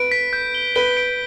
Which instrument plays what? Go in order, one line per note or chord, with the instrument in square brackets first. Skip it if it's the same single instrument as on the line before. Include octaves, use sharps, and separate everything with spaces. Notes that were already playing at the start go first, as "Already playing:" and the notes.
Already playing: [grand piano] B4 [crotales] D7
[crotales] B6
G6
G7
[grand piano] B4 [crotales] G7
[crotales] D7